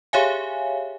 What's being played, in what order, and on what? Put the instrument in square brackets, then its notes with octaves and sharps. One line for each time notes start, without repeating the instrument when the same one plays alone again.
[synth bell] G4 G#4 C#5 E5 F5 G#5